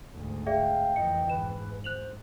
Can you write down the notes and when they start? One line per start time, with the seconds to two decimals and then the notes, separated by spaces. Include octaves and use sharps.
0.13 D2 G#2
0.47 G#4 D5 E5 F5 G5
0.96 F2 E3 D#5 C#7
1.30 G#2 B4 E7
1.84 C5 F#6 F7 F#7